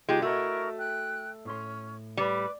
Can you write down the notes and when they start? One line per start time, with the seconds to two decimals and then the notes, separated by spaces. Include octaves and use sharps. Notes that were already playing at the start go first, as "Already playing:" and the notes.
0.09 C#3 G#3 D#4 F4 G4
0.22 A3 E4 F#4 A#4 D#5 C#6
0.78 G5 F#6
1.45 A2 C#4 C6
2.17 G3 B4 D6